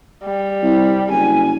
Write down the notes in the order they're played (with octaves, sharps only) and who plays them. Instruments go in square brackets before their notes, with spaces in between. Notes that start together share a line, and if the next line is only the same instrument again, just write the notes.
[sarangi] G3
[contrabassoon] C2
[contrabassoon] F#1 [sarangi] G#5